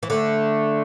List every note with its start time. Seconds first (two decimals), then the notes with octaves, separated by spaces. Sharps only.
0.03 E3
0.10 D3 A3